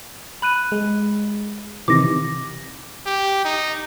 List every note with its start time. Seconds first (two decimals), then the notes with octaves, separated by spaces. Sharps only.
0.42 B5 F#6 D#7
0.72 G#3
1.88 C3 D#3 E3 D6 A#6
3.06 G4
3.45 D#4